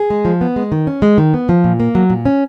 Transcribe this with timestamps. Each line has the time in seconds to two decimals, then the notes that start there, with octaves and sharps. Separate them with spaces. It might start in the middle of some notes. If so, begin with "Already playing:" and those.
Already playing: G#4
0.10 G#3
0.25 F3
0.41 B3
0.56 G#3
0.72 D#3
0.87 C#4
1.02 G#3
1.18 D#3
1.34 B3
1.49 F3
1.64 A#2
1.80 A#3
1.95 F#3
2.10 A#2
2.25 C#4